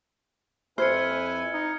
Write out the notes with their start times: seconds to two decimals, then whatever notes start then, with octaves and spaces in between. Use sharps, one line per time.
0.78 F2 E4 B4 C5 G#5 F6 G#6 C#7
1.54 D#4